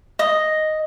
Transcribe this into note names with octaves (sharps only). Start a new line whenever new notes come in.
D#5